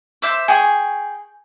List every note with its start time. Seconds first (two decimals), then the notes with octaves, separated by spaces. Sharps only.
0.22 C5 E5 D6
0.48 G#4 G5 G#5 C#6